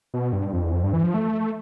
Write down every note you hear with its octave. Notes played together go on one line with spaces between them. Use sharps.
B2
G2
F2
E2
F2
G2
E3
F3
A3